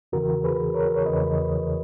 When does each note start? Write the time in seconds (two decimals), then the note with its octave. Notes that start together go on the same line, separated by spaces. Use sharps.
0.12 E2 C#3 E3 F#4 A#4
0.44 G#4 B4
0.74 A#4 C#5
0.96 C#5
1.06 E2 C#3 E3 B4 D#5